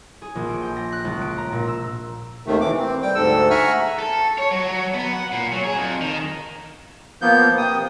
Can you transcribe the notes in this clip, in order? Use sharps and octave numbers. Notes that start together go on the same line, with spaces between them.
G#4
A#1
D7
G5
A#6
F#6
C#2
D7
A#5
A#2
E6
D#2 C3 D#3 A3
E3 D6
C4
G3 G5
D2 G#2 A4 E6
E5 F#5 G#5 A#5 C#6 F6
A4
C#5
F#3
F#3
B3
F#5
A#2
F#3
G#4
F2
D#3
F3 A#3 B3 G6
C3 G5 D#6